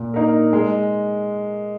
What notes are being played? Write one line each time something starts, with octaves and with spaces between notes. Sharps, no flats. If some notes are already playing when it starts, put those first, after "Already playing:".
Already playing: A#2
A#3 D#4 A#4
G#3